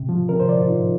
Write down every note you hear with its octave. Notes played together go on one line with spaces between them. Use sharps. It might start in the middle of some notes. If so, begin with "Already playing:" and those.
Already playing: C3
F3
C3 A#4
C5
F3 D5
F4
F3 D#4